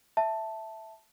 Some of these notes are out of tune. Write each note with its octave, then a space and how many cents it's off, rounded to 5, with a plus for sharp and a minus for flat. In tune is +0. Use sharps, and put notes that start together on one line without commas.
E5 +0 A5 +0